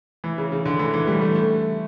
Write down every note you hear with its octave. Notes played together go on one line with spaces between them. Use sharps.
E3
C#3
C#3
D3
E3
E3
G3
A3
A3